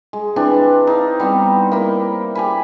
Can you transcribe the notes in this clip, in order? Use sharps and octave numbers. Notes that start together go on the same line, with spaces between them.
G#3
E3 C4 D4
D#4 F5
G3 B3 C4
A#3 E4
G4 G#5 B5